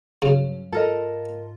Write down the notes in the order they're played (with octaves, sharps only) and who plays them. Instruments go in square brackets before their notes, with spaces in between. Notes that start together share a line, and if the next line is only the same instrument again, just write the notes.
[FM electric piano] G2 F#3 C#4 [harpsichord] C#3
[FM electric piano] G#2 F4 [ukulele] A4 A#4 D#5